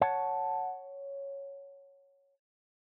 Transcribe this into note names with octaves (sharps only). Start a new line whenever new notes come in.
C#5 F#5 A5